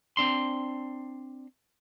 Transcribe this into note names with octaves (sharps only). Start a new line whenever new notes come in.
C4 D4 C6